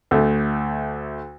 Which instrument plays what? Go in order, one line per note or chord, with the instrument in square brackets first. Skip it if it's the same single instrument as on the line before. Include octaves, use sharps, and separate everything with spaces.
[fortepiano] D2 A3